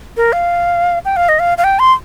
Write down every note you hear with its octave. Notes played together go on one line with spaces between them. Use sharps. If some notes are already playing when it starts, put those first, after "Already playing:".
A#4
F5
G5
F5
D#5
F5
F5
G5
C6